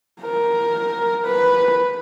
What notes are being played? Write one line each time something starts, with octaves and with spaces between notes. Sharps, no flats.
A#4
B4